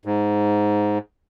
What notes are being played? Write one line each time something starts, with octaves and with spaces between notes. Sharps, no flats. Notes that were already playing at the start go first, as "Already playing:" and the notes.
G#2